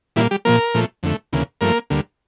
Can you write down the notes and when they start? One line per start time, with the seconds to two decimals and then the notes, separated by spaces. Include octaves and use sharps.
0.16 A#2 E3 G3 A#3 E4
0.31 G3 G4
0.45 A#2 F3 A#3 A#4
0.75 A#2 F3 A3
1.03 F2 D3 A3
1.33 D2 C#3 E3 A#3
1.61 G2 F3 A3 A#3 A#4
1.90 D2 D3 G3 A#3